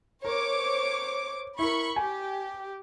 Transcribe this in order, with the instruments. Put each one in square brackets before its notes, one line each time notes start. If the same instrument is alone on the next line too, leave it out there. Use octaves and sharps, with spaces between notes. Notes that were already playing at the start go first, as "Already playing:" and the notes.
[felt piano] A#4 [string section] C5 C#5 D6
[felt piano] E4 A#4 [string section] B5 C#6
[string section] G4 [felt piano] G#5